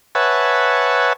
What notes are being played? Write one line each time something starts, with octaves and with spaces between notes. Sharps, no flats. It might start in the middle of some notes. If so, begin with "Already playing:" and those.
B4 C#5 E5 F#5 G#5 A5